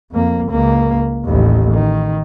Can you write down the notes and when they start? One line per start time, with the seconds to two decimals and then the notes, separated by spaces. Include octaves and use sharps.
0.12 F2 A#3
0.49 C#2 A#3
1.25 A1 D#2
1.74 D#3